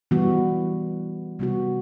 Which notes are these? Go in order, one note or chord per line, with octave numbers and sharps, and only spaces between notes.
E3 G3 B3 F#4
C3 G3 B3 F#4